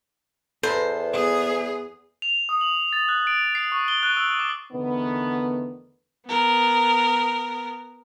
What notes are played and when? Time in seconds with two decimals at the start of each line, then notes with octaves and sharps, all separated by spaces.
0.63 E2 A4 B4 C5
1.13 B3 G#4
2.22 F7
2.49 D#6
2.61 F#7
2.93 A6
3.09 F#6
3.27 D7
3.55 C7
3.72 C#6
3.88 G7
4.03 F#6
4.17 E6
4.39 D6
4.72 E2 D3 D#3 A3 B3
6.27 B3 A#4